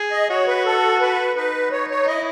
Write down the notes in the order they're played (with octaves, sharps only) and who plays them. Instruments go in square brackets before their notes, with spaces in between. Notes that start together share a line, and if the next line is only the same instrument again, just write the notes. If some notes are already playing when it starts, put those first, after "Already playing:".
Already playing: [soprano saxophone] G#4
[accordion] D#5
[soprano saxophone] F#4 [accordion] C#5
[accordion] B4
A4
B4
[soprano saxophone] D#4 [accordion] B4
[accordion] C#5
C#5
[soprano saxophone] D#4
[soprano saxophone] E4 [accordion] D#5